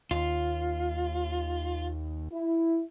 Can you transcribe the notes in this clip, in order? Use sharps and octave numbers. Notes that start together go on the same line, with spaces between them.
D#2 F4
E4